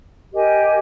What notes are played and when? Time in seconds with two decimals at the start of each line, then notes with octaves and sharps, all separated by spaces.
0.32 G4 A#4 D#5 G#5